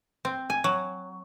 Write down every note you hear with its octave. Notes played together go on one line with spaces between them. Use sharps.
C4
G#5
F#3